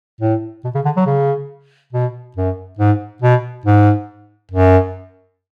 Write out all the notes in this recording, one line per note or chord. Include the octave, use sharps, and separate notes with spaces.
A2
B2
C#3
D3
F#3
C#3
B2
F#2
G#2
B2
G#2
F#2